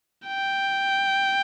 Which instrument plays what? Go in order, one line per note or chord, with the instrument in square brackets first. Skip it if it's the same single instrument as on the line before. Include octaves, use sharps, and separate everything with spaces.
[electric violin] G5